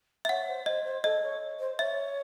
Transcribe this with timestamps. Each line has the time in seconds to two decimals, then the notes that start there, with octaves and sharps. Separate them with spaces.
0.25 E5
0.29 C#5 F#5
0.48 C5
0.66 C5 D#5
0.85 C5
1.04 A4 D#5
1.23 C#5
1.60 C5
1.79 C#5 E5